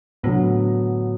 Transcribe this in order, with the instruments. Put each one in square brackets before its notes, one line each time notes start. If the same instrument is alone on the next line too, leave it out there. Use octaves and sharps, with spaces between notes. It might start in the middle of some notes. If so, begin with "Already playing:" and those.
[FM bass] A2 [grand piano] D3 F#3 B3